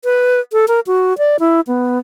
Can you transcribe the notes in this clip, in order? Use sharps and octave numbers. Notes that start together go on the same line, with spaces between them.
B4
A4
A#4
F#4
D5
E4
B3